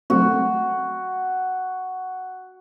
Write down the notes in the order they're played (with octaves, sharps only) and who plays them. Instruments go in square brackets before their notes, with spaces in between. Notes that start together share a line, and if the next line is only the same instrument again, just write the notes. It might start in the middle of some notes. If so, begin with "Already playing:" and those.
[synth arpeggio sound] F#3 A3 C4 [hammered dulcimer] F#4